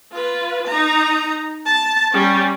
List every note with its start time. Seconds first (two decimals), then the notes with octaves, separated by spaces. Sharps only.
0.11 F4 B4
0.67 D#4 A#5
1.66 A5
2.12 G3 C#4